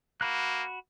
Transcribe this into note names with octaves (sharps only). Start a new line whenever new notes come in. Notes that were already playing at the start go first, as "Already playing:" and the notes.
A#3 F#4 B5 F#6